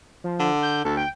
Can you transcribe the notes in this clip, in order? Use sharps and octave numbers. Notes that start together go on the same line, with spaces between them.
F3
D3
G6
D2 A4
G5